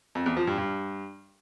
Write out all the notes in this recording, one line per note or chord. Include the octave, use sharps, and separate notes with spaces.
F2
E2
F3
G2
G2